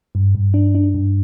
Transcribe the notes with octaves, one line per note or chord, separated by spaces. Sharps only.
G2
G2
D4
D4
G2